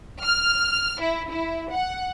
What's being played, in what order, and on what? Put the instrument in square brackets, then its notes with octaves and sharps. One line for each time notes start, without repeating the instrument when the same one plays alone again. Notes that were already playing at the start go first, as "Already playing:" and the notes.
[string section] F6
E4
E4
F#5